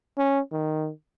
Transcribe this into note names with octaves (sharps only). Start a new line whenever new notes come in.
C#4
D#3